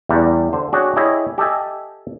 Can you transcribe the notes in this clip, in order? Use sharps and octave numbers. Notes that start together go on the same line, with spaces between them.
E2 G3 F#5
D3 C5
D4 F#4 G#4 C#5 G5
E4 G4 G#4 C#5 D#5
G4 A4 D#5 E5 G#5